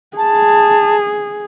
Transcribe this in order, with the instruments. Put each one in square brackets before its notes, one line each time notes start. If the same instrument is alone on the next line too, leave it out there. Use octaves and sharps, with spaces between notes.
[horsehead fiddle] G#4 [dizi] A5